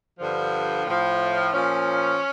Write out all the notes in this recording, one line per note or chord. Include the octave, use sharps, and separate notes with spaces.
G2 D3 F3
A2 F3
A#2 F3 C#4